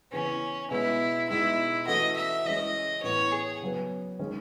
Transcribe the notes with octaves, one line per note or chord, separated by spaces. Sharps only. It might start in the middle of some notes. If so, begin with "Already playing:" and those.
C#3 E3 B3 C#4
B2 G#3 B3 E4
B2 G#3 D#4 E4
E3 A3 C#4 F#4 D#5
E5
E3 G#3 C#4 D#5
A2 E3 B3 C#5
G#4
C#3 F#3 B3
D#3 G#3 C#4